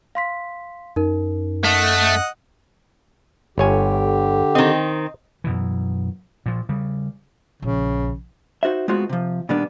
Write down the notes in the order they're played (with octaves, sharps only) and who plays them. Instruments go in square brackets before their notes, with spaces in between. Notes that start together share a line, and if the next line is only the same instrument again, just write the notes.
[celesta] F5 C6 B6
[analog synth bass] F#2 [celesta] D#4 A#4
[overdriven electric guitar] A3 [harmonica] D#5 F#5
[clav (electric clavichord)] G1 C#5 G#5 [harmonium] D3 G4
[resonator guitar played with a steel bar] D#3 C4 [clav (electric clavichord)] D#5
[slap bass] F#2 B2 E3
A#2 F3
C#3 G3
[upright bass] A#1 [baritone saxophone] C#3
[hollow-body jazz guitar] D#4 F#4 C5 E5
G#3 A3 B3 C4 F4 F#4
C3 F3
A#2 D#3 G3 A#3 B3 D4